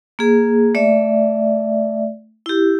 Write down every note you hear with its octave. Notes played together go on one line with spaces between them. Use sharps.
A#3 G#4
A3 D5 E5
E4 G4